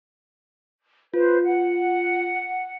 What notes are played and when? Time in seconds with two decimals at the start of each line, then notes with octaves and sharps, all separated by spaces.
1.14 F4 B4 C5
1.43 F#5